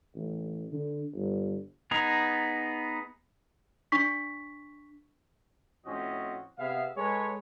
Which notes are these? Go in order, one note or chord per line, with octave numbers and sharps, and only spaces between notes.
A1
D3
G1
B3 D#4 G#4 A#5
D4 C#6 B6
A2 F3 C4 C#4 F#4 D#5
C3 B3 G#4 E5 F5
G#3 A4 B4 C#5